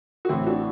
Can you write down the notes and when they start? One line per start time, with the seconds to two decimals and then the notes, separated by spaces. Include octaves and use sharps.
0.25 F#4
0.29 A1 A2 E3 C4 E4
0.47 D4 F#4